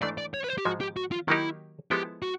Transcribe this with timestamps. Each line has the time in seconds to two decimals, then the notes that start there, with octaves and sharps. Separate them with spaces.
0.02 G#2 E3 A3 D4 D5
0.18 D5
0.34 C#5
0.44 B4
0.49 C5
0.58 G4
0.65 G#2 F3 G#3 F#4
0.81 G4
0.97 F#4
1.12 F4
1.28 D#3 F#3 A#3 D#4 E4 G4
1.91 F3 G#3 B3 E4 G4 A4
2.22 F#4